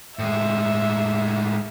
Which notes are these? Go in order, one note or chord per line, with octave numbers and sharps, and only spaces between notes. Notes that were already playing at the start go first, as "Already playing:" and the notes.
A2 G#3 E5